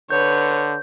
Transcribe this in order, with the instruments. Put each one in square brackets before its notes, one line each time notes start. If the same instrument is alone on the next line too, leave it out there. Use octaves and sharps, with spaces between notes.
[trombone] D3 [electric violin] B4 C#5 [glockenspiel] G6